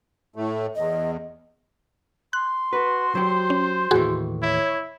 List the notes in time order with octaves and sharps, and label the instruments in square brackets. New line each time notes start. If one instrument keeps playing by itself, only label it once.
[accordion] A2 A3
[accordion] E2 [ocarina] D#5
[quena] C6 [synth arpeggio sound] F#6
[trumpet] F#4 [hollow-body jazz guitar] B4
[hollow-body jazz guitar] F#3 G4 [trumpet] C5
[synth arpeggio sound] C#4
[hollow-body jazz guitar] D#2 A2 E3 [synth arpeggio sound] F#4 G#4
[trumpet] E4 [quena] C#5